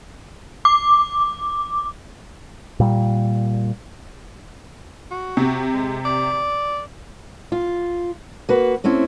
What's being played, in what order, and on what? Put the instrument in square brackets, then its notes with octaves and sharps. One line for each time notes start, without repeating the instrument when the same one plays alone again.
[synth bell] D6
[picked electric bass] A#2 G3
[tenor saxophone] F#4
[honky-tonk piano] C3
[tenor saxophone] G#3
D5
[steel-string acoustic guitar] F4
A#3 F#4 B4
A3 C4 C#4 E4